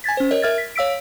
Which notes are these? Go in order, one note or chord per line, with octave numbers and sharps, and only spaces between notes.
G#5 G#6 A6 B6
C#4 C5
A#4 C#5 D#5
A#4 E5 F6 G#6 A6
B6
C#5 F5 E6 B6 D7